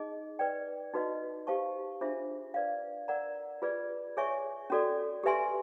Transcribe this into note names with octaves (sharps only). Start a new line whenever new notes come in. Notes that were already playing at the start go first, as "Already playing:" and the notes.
Already playing: D#4 G#4 D#5
B4 D5 G5
D#4 F#4 B4 D#5
G4 C5 F5 A5 C#6
D4 F4 G#4 C5 E5
B4 D5 F5
A#4 D5 F#5 A#5
F4 G#4 B4 D5
G#4 C#5 E5 G#5 C#6
C#4 F#4 A4 D5
G4 B4 E5 G#5 C6